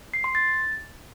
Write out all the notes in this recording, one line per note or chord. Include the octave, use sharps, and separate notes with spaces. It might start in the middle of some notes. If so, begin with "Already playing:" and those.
C7
C6
A6